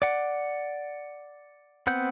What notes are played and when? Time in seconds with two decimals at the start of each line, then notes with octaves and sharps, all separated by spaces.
0.02 D5 F#5
1.87 B3 C4 F#5 G6